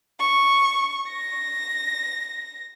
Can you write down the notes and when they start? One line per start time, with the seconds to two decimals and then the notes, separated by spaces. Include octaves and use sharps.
0.20 C#6
1.09 A#6